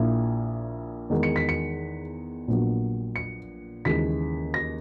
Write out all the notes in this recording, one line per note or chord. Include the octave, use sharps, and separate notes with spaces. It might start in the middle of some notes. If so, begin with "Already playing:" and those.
Already playing: A#1 A#2 A#3 E4
E2 D#3 G#3
C#7
B6
C#7
A#1 A#2 F#3 B3
C#7
D#2 C#3 E3 G#3 B6
A#6